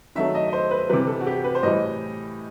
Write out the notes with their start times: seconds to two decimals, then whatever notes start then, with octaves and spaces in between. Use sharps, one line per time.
0.16 D#3 F#3 A3 E5
0.35 D#5
0.48 D#5
0.53 C5
0.71 B4
0.89 C3 E3 G3 B4
1.07 A4
1.20 F#4
1.27 G4
1.44 B4
1.55 C5
1.62 A2 E3 G3 D#5